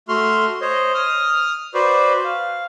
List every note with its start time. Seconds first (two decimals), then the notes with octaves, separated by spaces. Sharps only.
0.08 A3 F#4 C6 F6
0.61 C5 C#5 D#5
0.94 D#6 F6
1.74 F#4 B4 C5 D5
2.24 F5